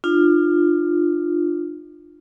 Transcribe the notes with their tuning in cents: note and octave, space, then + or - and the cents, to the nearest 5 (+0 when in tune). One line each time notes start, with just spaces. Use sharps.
D4 +40 F4 +0